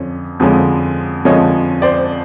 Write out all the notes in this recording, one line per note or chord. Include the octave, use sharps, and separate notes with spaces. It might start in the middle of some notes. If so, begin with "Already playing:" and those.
Already playing: F2 D3 F3 C#4
F2 D3 F3 G#3 C#4
F2 D3 F3 G#3 C#4 C#5 D#5
C5 D5